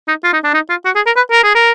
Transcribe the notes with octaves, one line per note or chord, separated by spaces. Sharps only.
D#4
F4
D#4
D4
D#4
F4
F#4
G#4
A#4
B4
A#4
G#4
A#4